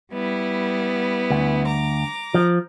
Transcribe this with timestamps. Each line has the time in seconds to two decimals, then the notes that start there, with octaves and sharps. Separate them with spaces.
0.13 G3 B3 E4
1.30 D2
1.68 A#5 D6
2.34 F3